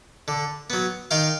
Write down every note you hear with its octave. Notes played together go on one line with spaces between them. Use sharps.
D3
F#3 B3
D#3 F5 G5